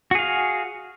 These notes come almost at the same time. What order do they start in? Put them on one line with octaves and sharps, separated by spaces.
F#4 G#4 F5